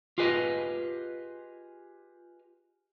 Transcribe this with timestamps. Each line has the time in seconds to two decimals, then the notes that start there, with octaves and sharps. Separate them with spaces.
0.18 F4 G4 G#4 B4 D#5